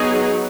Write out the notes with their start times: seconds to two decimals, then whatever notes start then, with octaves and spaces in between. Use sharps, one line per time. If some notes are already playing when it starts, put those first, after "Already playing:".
Already playing: F#3 B3 D#4 G#4